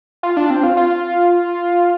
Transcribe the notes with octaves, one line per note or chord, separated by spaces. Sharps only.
F4
D4
C4
F4
F4